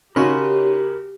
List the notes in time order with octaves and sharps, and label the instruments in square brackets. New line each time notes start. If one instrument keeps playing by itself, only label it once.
[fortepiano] C#3 F#4 [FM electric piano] D#4 C#5 [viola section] G4 [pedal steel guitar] A#4 B5 C6